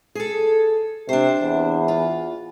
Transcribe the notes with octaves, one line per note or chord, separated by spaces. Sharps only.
G#4 A4
C3 D4 C5
E2
F4